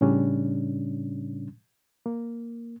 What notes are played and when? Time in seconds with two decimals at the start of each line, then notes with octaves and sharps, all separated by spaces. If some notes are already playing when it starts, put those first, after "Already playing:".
0.01 A2 C#3 G3 C#4 D4
2.06 A#3